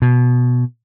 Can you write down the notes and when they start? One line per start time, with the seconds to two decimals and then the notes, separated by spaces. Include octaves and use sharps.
0.02 B2